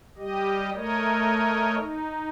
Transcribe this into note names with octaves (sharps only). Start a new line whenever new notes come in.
G3 G4 D#5
A3 A#4 C#5 D#5
D#4